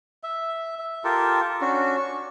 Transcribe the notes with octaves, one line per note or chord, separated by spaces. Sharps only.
E5
E5
F4 G4 A4 A#4
C#4 D4 F#4
C#6